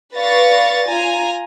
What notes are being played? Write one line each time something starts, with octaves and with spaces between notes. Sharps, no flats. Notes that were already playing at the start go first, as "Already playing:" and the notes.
B4 D5 F5 C#6 A6 A#6
F4 G#5 A#5